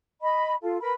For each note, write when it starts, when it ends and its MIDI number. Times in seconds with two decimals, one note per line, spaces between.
0.21 0.54 75
0.21 0.54 83
0.62 0.81 65
0.62 0.81 69
0.81 0.93 70
0.81 0.93 71
0.81 0.93 83